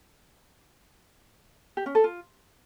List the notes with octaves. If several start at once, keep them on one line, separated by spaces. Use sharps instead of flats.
G4
C#4
A4
F4